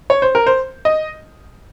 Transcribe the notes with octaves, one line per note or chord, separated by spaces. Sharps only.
C#5
C5
A#4
C5
D#5